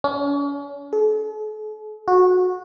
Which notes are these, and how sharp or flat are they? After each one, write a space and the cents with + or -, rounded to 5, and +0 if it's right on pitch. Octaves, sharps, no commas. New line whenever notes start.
C#4 +40
A4 -45
F#4 -20